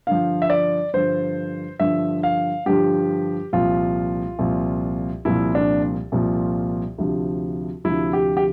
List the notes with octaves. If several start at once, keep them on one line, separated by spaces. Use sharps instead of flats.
G2 D3 F3 F5
E5
D5
G2 D3 F3 C5
G2 D3 F3 E5
F5
G2 D3 F3 G4
C2 A#2 F3 F4
C2 A#2 F3
C2 A#2 F3 E4
D4
C2 A#2 F3
D2 C3 F3
D2 C3 F3 E4
G4
G4